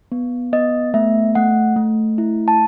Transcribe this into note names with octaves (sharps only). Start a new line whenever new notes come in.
B3
B3 D#5
A3 E5
A3 F#5
A3
E4
A5